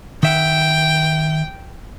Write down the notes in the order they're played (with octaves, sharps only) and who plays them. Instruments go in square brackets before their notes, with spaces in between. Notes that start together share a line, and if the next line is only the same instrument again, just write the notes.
[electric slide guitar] D#3 E5 F#5 [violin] G5